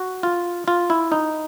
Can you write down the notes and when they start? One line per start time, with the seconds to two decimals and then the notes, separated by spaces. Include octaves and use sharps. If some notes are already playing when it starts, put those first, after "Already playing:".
Already playing: F#4
0.23 F4
0.68 F4
0.90 E4
1.12 D#4